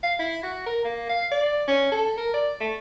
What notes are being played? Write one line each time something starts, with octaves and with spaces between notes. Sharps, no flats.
F5
E4
F#4
A#4
A#3
F5
D5
C#4
A4
A#4
D5
A3